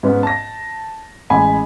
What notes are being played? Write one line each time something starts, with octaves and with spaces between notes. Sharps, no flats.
G#2 B3 C#4
A5 A#6
A1 G#3 G#5 B5